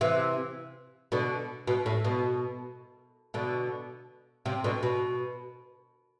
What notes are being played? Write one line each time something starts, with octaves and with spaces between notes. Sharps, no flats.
C3 E3
B2 D3
B2
A2
B2
B2 D3
C3
B2 D3
B2